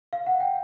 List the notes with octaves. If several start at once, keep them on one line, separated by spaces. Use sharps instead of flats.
F5
F#5
G5